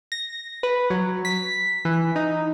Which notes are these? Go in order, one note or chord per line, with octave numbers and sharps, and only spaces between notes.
A#6
B4
F#3
B6
E3
D#4